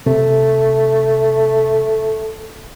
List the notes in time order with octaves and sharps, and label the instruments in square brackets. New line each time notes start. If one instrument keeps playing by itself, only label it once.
[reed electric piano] C3 [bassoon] A3